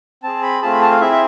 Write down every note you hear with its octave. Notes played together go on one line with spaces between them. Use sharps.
C4 G#4 A5
B5
A3 C4 F4 G#4 A5
B5
A5
F5
C4 E4 G#4 E5
E5